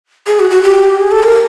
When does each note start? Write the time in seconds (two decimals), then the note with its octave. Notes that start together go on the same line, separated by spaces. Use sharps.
0.27 G#4
0.40 F#4
0.50 F#4
0.63 G4
0.99 G#4
1.11 A4
1.23 A#4